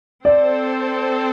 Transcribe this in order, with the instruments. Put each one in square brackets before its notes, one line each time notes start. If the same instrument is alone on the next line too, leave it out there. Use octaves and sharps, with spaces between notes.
[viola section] C4 A4 C5 [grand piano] D5